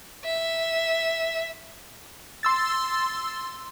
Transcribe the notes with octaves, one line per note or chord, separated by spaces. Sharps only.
E5
C6 E6 A6